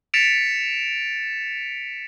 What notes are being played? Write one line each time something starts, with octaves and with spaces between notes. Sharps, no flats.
A6 B6 C#7 D7 E7 F7